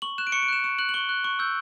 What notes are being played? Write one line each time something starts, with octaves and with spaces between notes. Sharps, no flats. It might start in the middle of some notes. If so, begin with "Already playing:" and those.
C#6 F#7
F#6 E7
D7
C#6 C#7
D7
F#6 E7
C#6 E7
F#6 F#7
F#7
C#6 G7
F#6
C#6
E6 G6